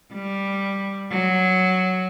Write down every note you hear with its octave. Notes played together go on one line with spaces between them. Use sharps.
G3
F#3